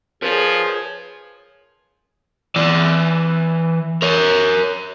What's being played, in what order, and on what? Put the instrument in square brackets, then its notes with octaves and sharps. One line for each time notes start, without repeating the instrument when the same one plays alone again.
[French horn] F3 [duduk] G#4 [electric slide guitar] A#4 B4 C#5
[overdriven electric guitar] E3 D5
A#4 C#5